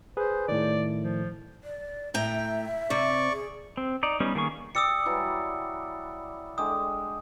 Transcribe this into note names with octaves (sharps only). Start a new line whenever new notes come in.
G#4 B4 C5
A2 D#3 D5
F3
D5
A2 E5 G5 A#5
C3 D5 C#6
G#4
C4
D#4 D5
G3 B3 C#4 D#4
D#3 A#3 G#4 C#6
G4 D5 D#6 E6 C#7
E3 F#3 G3
D3 G#3 G4 D#6